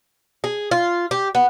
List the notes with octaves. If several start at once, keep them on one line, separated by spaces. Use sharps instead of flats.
G#4
F4
G4
B3